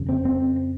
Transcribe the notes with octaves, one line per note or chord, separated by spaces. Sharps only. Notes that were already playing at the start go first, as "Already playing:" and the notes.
Already playing: F2 C#3
C4
C4